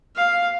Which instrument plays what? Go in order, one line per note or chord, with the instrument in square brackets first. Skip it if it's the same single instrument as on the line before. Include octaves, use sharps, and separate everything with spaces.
[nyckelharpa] F5